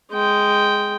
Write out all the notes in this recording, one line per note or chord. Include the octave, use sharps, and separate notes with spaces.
G#3 G5